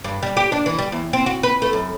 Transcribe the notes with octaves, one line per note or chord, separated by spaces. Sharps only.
G2
G3
G4
D4
E3
G3
E2
C4
F#4
B4
A3
F#2